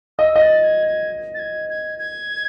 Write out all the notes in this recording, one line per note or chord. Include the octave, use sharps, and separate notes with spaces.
D#5 E6
D#5
A6
G#6
G#6
A6
G#6
G#6
G#6